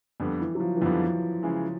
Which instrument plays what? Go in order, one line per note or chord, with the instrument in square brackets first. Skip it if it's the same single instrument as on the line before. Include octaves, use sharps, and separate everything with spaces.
[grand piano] F2 D3 G3 B3
[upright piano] E3
F#3
F3
E3
[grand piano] F2 D3 G3 B3 [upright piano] F3
[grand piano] C#3 E3 G#3